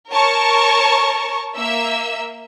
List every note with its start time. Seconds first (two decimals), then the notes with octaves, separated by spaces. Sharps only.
0.12 A#4 C#5 A5 C#6
1.56 A#3 E5 E6